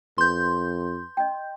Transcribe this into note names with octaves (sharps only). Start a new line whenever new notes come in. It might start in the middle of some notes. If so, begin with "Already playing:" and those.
F2 B4 C6 G6
D#5 G5